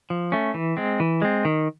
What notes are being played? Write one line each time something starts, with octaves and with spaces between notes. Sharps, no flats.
F3
A3 C#4
E3
G#3 C4
E3
G#3 C4
D#3